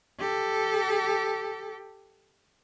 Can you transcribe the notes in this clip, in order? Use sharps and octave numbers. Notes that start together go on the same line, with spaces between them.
G4 A4